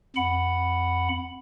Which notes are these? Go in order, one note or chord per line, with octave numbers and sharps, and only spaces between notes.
F2 F#5 B5